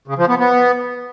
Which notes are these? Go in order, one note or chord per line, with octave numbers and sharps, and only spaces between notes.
C#3
F3
B3
B3